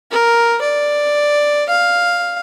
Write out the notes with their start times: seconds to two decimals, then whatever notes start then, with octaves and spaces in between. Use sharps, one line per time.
0.11 A#4
0.61 D5
1.69 F5